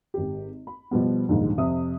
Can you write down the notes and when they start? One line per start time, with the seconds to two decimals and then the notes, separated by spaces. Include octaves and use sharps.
0.14 G#1 G4
0.67 B5
0.91 B2 F3 G3 B3
1.29 A#1 D#2 G#2 D3 G3
1.58 F2 C3 E5 D#6